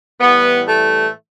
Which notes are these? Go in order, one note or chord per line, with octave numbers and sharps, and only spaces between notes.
A2 E3 G3 B3
A3